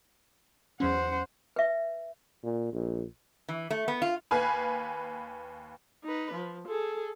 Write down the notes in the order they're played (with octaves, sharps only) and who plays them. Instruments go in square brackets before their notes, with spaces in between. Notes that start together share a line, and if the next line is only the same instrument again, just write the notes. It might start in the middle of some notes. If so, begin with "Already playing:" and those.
[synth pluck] E2 F#3 C#4 [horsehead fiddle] C5 F#5
[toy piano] B4 E5
[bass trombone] A#2
A#1
[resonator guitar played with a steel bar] E3
A3
B3
F4
[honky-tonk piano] D#2 B4 F5 G#5 B5
[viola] D#4 B4
F3
G#4 A4